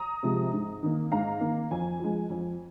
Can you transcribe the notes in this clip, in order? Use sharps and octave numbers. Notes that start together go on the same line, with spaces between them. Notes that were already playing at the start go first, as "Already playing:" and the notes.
Already playing: A#5 D#6
C3 F3 G#3
G#2
D#3 A#3
G#2 F5 A#5
D#3 A#3
F2 G#5
F3 G#3
F2